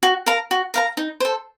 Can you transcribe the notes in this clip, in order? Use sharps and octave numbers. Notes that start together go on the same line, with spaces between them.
F#4
A#4 F5 A#5
F#4
A#4 F5 A#5
D#4
A4 C5